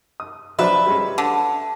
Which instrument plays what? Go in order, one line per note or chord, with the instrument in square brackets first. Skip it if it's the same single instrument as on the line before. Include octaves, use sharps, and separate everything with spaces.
[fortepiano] D#6
[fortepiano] F3 F#3 D4 [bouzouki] B4 E5
[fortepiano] G3 G#3 C#4
[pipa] D3